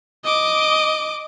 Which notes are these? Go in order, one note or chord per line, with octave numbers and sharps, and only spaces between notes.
D#5 D6